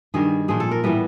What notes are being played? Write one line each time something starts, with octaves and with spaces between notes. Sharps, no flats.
G2 D#3 G3 G#4
A#2 F3 A#3 G#4
A4
A#4
A2 E3 G3 B3 B4